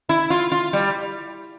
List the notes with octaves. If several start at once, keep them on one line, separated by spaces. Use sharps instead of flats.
E4
F4
F4
G3